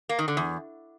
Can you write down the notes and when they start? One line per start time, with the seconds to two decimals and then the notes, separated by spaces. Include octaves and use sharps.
0.09 A#3
0.19 D#3
0.28 D3
0.37 E2